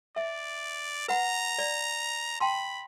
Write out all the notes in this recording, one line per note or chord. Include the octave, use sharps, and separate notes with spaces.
D5 E5
B4 F#5 A#5 B5
D5
G5 A5 B5 C6